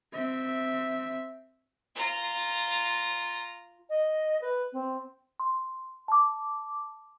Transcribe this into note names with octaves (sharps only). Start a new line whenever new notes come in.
C4 E5
F4 A#5
D#5
B4
C4
C6
A5 D6